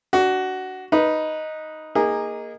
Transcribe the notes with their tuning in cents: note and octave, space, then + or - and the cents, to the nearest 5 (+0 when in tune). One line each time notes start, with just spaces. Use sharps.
D4 +0 F#4 +15
D#4 +0 B4 -10
A#3 +0 D#4 +5 G#4 -20